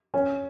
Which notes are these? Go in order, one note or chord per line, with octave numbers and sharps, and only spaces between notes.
C#4